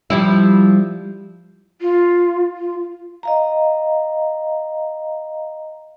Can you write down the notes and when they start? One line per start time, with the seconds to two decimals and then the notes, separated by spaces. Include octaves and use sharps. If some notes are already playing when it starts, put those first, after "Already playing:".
0.10 F3 G3 E4
1.81 F4
2.57 F4
3.23 D#5 F5 A#5